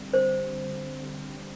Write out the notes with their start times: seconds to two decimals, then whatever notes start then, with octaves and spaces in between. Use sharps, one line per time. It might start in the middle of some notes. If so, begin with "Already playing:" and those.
Already playing: D3 G3 C4
0.13 C5